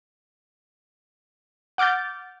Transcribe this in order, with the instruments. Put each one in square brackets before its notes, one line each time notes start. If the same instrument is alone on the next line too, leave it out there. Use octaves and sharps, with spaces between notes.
[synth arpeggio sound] F#5 D6 F6 G6 A6